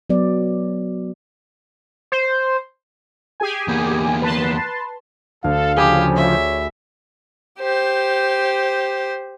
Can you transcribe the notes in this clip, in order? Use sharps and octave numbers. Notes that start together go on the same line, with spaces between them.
F#3 B3 D5
C5
G4 G#4 G#5
E2 A#3
B4 A5 C6
D2 A4 F5
C#3 F3 G4 G#4 G#5 B5
C#5 E5
G4 C5